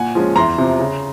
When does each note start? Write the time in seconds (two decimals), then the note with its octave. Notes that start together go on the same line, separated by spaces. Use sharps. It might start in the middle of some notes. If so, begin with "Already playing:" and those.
Already playing: A#2 F#5 G#5
0.15 F3 G#3 C#4
0.36 E2 A#5 C6
0.58 C3 F3
0.79 C#3